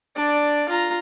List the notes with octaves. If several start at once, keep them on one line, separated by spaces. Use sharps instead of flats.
D4 D5
F4 A#5